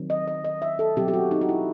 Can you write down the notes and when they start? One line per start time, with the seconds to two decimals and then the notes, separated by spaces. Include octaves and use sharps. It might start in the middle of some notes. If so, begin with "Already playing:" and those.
Already playing: D#3 F#3 C4
0.10 D#5
0.28 D#5
0.45 D#5
0.62 E5
0.79 A4
0.96 B2 F#3 C4 G4
1.08 G4
1.14 F#4
1.31 D#4
1.41 F#4
1.49 E4